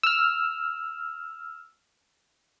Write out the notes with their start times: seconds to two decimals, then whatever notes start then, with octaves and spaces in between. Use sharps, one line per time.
0.03 E6 F6